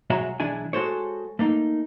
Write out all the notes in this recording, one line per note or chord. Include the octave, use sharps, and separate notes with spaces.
B1 G#3 F#4 C#5 E5 A#5
B1 E3 G#3 D4 E4 G#5
G#3 F#4 A4 C5 C#5
A3 A#3 D#4